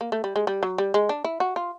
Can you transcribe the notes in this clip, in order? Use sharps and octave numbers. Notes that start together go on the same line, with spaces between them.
A#3
A3
G3
G#3
G3
F#3
G3
G#3
D4
E4
F#4
F4